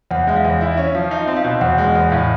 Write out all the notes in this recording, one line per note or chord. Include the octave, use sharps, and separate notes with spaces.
E2 F#5
G#3 E5
F5
E2
E4 E5
C#4 E5
F3 F5
D#4 E5
C4
F5
B2
E2 F#5
G#3
E2
A2 F5